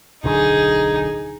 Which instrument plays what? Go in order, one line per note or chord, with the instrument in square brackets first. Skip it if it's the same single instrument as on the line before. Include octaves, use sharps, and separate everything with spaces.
[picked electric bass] D1 B1 D3 [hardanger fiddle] D#4 G#4